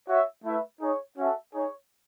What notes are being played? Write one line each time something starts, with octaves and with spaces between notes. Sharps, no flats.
F#4 C#5 E5
A3 E4 B4 E5
D#4 G#4 C#5
C#4 F#4 A4 E5
D#4 G#4 C#5